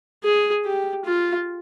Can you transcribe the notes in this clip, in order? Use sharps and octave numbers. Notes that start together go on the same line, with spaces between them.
G#4
G4
F4